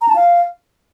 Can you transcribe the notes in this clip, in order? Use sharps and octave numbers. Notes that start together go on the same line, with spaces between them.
A#5
A5
F5